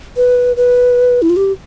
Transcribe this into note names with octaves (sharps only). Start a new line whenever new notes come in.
B4
B4
E4
F4
G4